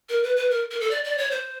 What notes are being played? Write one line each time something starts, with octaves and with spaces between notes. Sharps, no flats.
A#4
B4
B4
A#4
A#4
A4
D5
D5
C#5
C5